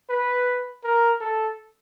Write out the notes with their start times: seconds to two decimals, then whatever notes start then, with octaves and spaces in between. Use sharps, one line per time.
0.09 B4
0.84 A#4
1.21 A4